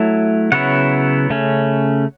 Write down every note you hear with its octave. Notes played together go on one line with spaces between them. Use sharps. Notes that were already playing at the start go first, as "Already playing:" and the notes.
Already playing: F#3 A3 E4
C#3 F#3 B3 E4 C#5 F#5
C#3 A3 C#4